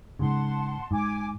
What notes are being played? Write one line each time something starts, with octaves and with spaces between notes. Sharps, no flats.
G#2 C#3 F#5 A5 C6
G#2 G#5 D6